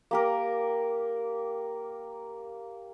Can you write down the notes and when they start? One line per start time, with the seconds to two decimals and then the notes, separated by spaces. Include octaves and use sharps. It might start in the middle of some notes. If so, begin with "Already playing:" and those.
0.11 A#3 G4 A#4